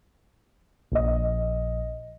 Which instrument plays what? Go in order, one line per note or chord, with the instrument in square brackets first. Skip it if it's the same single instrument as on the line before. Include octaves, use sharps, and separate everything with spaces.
[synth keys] A#1 D#5